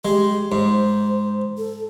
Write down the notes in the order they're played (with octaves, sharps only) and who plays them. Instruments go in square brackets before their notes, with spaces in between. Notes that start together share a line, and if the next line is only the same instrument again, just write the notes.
[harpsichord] G#3 [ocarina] G4
[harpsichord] G#2 [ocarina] C5
[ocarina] A4